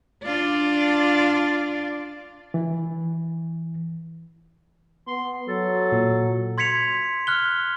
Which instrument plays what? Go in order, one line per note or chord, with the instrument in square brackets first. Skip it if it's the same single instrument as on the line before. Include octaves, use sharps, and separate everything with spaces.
[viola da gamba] D4 F4 D5
[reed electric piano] E3
[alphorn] B3 [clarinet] C6
[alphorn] F#3 [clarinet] A4
[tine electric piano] A#2
[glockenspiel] C6 G#6 B6 C#7 F7
F6 F#6 G7